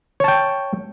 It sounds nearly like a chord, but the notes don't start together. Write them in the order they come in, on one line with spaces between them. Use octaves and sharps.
C#5 A5 G5